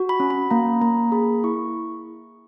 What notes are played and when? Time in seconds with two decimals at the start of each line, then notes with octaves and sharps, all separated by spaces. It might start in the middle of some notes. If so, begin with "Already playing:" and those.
Already playing: F#4
0.09 B5
0.20 C#4
0.30 B5
0.50 A#3 A#5
0.81 A#3 A#5
1.12 G#4 B5
1.44 E4 C#6